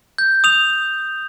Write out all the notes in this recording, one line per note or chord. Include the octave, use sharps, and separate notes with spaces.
G6
D#6 F7